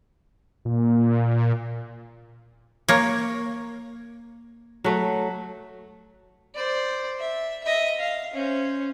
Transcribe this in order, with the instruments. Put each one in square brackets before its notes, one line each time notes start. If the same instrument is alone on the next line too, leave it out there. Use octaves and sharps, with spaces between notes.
[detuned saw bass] A#2
[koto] A#3 C#5
[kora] F#3 A3
[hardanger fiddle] C5 D5
E5
D#5 E5
F5
C#4 C5